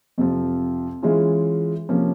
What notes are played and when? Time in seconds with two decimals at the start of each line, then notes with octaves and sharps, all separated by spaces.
0.18 F2 C3 F3
1.03 E3 G#3 C#4 F4
1.89 C3 F3 A#3 C#4